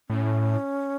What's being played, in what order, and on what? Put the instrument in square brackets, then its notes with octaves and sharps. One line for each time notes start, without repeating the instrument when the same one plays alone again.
[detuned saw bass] A2 [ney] C#4